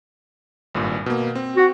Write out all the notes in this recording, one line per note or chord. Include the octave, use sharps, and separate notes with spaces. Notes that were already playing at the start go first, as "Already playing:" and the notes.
G#1 G2 A#2
B2 A#3
C4
F#4